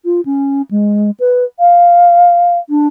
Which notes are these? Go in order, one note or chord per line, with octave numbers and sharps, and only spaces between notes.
F4
C#4
G#3
B4
F5
D4